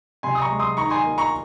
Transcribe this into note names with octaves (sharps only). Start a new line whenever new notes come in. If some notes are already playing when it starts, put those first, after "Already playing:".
C3 G#5 C6
D#6
A#5 C#6
G#3
C6 D#6
D#3 A#5 C#6
G#5 C6
A#3
A#5 C#6